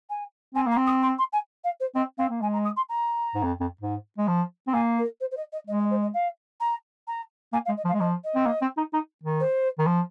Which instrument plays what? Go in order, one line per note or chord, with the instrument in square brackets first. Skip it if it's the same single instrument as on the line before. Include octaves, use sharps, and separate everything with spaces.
[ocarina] G#5
[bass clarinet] C4 [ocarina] G#5
[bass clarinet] A#3 [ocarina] A#5
[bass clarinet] C4
[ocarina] D#6
C6
C6
G#5
F5
C5
[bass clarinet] C4 [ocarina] D#5
[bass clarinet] C4 [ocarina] F5
[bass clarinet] A#3
[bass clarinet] G#3 [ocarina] G#5
[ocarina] A#5
D#6
C6
A#5
[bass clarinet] G#2
F2
F2
G#2
G#3
F3
C4
[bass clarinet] A#3 [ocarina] G#5
[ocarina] A#4
C5
C5
D#5
D#5
[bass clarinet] G#3 [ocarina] D#5
[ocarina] D#5
C5
D#5
F5
A#5
A#5
[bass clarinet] A#3 [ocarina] G#5
[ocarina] F5
[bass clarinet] G#3
[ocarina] D#5
[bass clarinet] F3
[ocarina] F5
[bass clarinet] G#3
[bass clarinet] F3 [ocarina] D#5
[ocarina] D#5
[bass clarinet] C4
A#3
C4
D#4
D#4
D#3
[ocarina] C5
[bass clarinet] D#3
F3